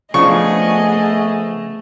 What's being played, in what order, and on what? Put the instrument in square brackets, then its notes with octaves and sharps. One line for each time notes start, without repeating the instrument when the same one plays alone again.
[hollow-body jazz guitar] C#3 F3 D4 [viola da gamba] A3 [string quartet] B3 G#4 D#5 [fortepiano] C#6